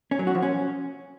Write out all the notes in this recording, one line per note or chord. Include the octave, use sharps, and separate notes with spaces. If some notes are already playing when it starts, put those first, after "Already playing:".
C#4
F#3
F#4
F3
C#4